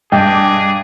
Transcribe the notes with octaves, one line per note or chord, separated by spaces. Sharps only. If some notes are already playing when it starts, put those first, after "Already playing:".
G2 G#4 D#5 G5 A5 D6